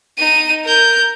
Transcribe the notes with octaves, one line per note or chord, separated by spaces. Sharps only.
D#4 D#7
A#4 G6